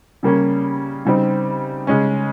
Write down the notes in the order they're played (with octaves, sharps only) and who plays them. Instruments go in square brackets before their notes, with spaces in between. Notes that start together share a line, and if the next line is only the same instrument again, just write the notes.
[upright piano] C#3 G3 A#3 C#4
C#3 G3 C4 D#4
C#3 G#3 C#4